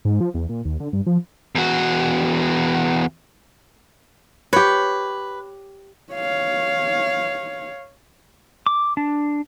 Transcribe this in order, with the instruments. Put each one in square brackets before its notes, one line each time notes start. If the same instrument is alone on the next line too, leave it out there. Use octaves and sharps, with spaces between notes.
[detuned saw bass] G#2
F3
E2
A#2
D#2
D3
G2
F3
[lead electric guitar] E2 F#4
[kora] G4 C#5 [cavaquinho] B4
[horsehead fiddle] C#5 F5
[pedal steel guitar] D6
D4